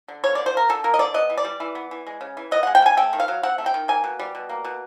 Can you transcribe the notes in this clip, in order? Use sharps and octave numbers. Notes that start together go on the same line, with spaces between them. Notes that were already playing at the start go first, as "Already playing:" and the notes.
D3
A#3 C#5
D3 D5
C5
F3 A#4
D3 A4
A#3 A#4
D#5
D3 D5
B3 D#5
E3
D5
G3
E3
B3
E3
G#3
C#3
E3
B3 D#5
G#3 F#5
G5
C#3 G#5
A3 G5
D#3
F5
F#3
C4 F#5
A3
G5
D#3
A#3 G#5
B2
G3
B2
A#3
B2